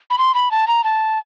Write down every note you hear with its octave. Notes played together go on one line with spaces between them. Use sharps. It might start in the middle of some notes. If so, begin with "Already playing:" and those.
B5
C6
B5
A5
A#5
A5